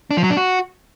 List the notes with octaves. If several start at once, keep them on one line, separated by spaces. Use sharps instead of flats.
D4
F3
F#3
D4
F#4